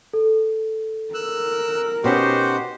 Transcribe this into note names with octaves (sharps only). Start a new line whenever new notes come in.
A4
A#4 E6 F#6
B2 C#4 D#4 F#4 G4 C5